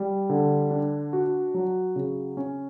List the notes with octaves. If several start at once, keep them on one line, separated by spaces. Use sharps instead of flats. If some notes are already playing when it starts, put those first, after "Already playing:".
Already playing: G3
D3
D4
F#4
F#3
C#3
C#4